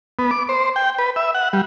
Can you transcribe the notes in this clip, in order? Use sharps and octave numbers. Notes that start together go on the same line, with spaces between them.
B3
D6
C5
G5
B4
E5
F#5
G3